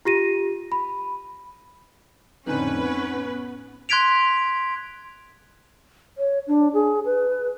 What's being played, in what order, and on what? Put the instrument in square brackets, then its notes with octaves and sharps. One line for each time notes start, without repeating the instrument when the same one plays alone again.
[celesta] F4 G4 A#6 D#7
B5
[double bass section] F2 A2 D3 [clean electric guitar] C4 D#4 G#5 [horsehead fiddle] C#4 [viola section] B4
[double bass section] B3
[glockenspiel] C6 F#6 G#6 B6 D7 F7
[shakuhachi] C#5
D4
G#4
B4